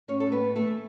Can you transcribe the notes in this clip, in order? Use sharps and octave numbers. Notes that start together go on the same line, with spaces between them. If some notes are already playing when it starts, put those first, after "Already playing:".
A2 C#4 C#5
A4
A2
B3 B4
A2
A3 A4
E3